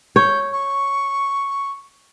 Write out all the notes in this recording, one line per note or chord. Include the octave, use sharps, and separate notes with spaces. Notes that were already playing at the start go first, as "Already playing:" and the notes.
C#5 G6
C#6